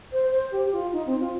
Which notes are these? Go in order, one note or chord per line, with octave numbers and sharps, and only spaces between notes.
C5
C5
G4
F4
D#4
C4
F4